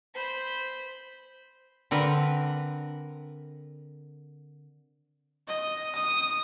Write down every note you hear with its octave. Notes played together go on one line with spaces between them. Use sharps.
C5 B5
D3 C4 A#4 B4
D#5
D#6